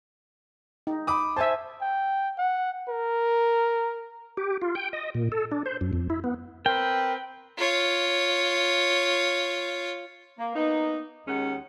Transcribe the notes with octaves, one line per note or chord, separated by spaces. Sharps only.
D#4
B5 D6 D#6
C5 E5 G#5 A5
G5
F#5
A#4
G4
F4
G5
D#5
A#2
A4
D4
C5
F#2
F2
E4
B3
C4 A#4 B4 G5
F4 C#5
A#3
A#3 B3 D#4
D#2 D#3 G#3 C#4 F#5